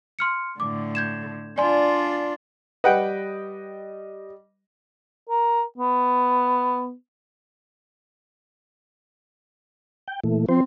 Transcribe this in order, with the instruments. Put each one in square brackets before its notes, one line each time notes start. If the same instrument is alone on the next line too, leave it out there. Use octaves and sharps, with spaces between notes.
[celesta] C6 F6 C#7
[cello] A2 D3 [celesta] D6
[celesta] G6 G#6 E7
[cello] D4 F4 [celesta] D5 G#5 C6
[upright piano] G3 D#5 [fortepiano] B4 F#5 G5
[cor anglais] A#4
B3
[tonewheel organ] G5
A#2 E3 A3
[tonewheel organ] F3 C5 [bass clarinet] C4